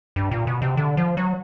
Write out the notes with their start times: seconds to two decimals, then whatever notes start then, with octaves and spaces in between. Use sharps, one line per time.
0.16 G2
0.31 A#2
0.47 B2
0.62 C3
0.77 D3
0.97 F3
1.17 F#3